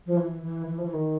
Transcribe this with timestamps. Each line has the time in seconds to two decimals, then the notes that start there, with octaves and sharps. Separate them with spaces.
0.06 F3
0.17 E3
0.42 E3
0.67 E3
0.78 F3
0.85 E3
0.93 D#3